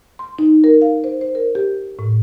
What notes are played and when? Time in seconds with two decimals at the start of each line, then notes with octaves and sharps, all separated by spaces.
0.19 C6
0.39 D#4
0.64 A#4
0.82 F5
1.04 C5
1.21 C5
1.35 A#4
1.55 G4
1.99 A2